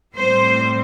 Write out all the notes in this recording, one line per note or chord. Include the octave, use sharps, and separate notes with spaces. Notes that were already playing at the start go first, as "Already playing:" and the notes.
A2 G3 C4 C5